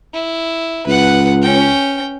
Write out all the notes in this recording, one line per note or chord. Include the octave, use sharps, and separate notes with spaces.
E4
C#2 B4 F#5
C#4 G5